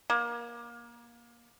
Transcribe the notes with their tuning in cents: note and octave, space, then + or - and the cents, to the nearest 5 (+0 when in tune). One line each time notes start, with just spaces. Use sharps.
A#3 +25